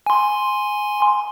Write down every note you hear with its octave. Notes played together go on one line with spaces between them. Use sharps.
G#5 C6